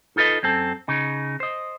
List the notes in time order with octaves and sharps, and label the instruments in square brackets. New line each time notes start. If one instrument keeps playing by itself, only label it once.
[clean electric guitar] D#4 F4 A4 B4 D#5
F#2 C4 A4
C#3 D#4
C5 D#5